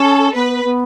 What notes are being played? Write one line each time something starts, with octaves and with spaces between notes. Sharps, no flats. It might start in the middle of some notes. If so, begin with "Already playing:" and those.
Already playing: C#4 A4
B3 B4
B3